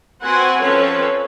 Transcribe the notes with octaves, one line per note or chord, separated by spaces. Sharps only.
C4 F#4 B4 F#5 G#5
F3 C4 C#4 A4 B4 C#5